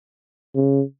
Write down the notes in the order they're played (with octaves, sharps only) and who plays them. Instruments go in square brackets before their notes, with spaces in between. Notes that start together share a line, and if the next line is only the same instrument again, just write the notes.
[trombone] C#3